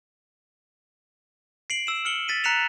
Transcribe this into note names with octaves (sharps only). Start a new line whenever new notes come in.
C7 D7 F#7
E6 E7
F6 C#7 F#7 G7
A6 B6 D#7
A#5 F#6 B6 C#7 E7 F7